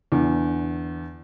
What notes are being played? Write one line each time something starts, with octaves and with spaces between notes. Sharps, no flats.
E2 D3